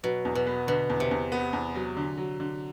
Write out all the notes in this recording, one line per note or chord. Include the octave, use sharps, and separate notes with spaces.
B2 F#3
E2
B2
B3
B2 D3
E2
C3
E2
B3
E2
F#3
D3
F#3
D3